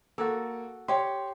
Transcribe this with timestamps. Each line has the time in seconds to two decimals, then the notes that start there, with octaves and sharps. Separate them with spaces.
0.18 A#3 F#4 A4
0.88 G4 C#5 C6